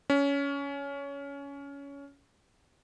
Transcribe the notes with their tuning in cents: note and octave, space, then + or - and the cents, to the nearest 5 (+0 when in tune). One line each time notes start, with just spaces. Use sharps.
C#4 +20